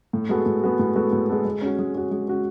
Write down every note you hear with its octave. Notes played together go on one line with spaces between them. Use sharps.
A2
G#3 B3 F#4 A4
A2
G#3 B3 F#4 A4
A2
G#3 B3 F#4 A4
A2
G#3 B3 F#4 A4
G#3
C#4 F#4
G#3
C#4 F#4
G#3
C#4 F#4